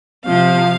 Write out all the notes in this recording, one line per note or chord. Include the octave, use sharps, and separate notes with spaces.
C3 F3 F5